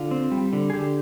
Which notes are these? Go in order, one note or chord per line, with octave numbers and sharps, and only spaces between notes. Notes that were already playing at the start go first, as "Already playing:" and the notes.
Already playing: D3 F4
C4
G3
D3
G#4
D3 G4